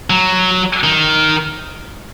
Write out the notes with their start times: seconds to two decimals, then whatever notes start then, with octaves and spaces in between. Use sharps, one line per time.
0.10 F#3
0.84 D#3